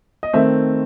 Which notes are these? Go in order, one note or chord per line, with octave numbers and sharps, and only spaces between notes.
D#5
D#3 A3 C4 E5